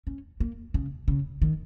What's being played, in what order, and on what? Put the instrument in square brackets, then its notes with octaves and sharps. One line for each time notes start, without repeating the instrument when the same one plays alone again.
[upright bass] C#4
A#3
C#3
C#3
D#3